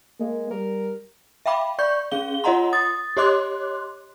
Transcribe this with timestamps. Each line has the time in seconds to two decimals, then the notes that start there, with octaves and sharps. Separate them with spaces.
0.20 G#3 A#3
0.51 G3 A#4
1.46 E5 F5 G5 B5 D6
1.79 D5 C#6 G6
2.11 C#4 G#4 F5 G7
2.44 F4 C#5 D#5 F#5 A#5 C6
2.73 D#6 A6
3.17 G4 C#5 D#5 C6 D6 F#6